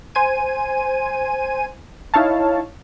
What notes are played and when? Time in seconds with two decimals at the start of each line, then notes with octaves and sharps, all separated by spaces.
0.15 C5 G#5 D#7
2.14 D#4 E4 C#5 F5 A5